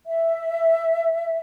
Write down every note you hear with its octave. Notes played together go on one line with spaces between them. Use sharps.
E5